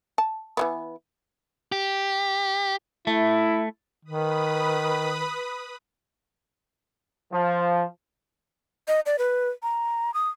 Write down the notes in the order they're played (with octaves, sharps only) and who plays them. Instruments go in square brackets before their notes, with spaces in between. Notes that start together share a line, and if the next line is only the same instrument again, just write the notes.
[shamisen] A5
E3 G3 B3
[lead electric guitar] G4
[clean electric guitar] A3 [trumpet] E4
[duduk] D#3 [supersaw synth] B4 B5 D#6
[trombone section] F3
[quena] D#5
D5
B4
A#5
D#6